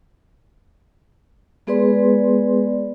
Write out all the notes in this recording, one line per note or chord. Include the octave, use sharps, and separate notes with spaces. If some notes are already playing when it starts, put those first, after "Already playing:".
G#3 B3 G#4 B4 D5 C6